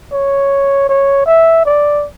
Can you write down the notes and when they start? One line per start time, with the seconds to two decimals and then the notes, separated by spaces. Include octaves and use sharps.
0.12 C#5
0.89 C#5
1.26 E5
1.65 D5